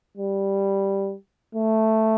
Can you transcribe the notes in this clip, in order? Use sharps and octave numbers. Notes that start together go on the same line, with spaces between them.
G3
A3